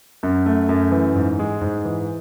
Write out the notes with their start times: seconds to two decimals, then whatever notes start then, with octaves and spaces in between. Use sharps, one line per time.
0.23 F#2
0.46 A3
0.69 F#2
0.92 E3
1.15 G#2
1.39 G#3
1.61 G#2
1.85 E3